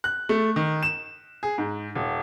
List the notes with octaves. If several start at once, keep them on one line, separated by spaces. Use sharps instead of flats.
F#6
A3
D#3
E7
G#4
G#2
D#1